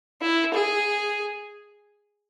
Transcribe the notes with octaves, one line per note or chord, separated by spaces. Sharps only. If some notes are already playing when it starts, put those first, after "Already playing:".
E4
G#4